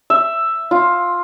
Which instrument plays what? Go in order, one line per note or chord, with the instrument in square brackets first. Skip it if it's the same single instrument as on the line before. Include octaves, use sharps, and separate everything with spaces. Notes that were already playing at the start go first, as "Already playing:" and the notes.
[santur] E5
F4